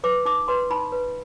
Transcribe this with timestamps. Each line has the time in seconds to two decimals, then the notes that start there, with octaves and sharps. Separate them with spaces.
0.04 B4 D6
0.25 D#4 D6
0.48 B4 C6
0.70 D#4 B5
0.92 B4